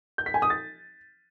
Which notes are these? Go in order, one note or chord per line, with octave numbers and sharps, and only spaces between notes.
G6
B6
G#5
D#6
A6